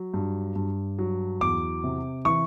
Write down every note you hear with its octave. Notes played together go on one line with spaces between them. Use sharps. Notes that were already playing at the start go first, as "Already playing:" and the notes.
Already playing: F#3
G2
G2
F#3
E2 D6
C3
E3 C#6